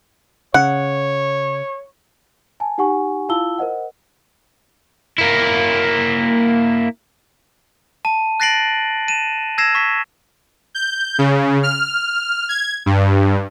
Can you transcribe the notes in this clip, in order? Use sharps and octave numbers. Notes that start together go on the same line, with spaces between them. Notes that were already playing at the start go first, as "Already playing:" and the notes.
C#3 C#5 F#5
G#5 A5
D#4 G4 F#5 G#5 C#6
E4 F4 F5 A5 E6 G7
A#4 C5 D#5 F#5
A#3 E4
A5 D#7
F#6 A6 A#6 C7 D7 F#7
D#7 E7
E6 G#6 A#6 C7 E7
C#6 B6
G6
C#3
F6
G#6
G2